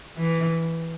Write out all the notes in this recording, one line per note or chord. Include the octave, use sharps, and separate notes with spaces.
E3